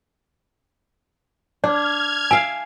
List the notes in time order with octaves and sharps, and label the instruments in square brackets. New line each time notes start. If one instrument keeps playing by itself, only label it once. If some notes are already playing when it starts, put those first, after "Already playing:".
[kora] D4 [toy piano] D5 [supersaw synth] F6 G#6
[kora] E5 F5 [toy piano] G#5